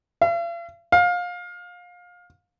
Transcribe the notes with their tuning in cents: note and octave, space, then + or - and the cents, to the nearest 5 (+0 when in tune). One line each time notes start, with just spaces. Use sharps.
F5 -45
F5 +25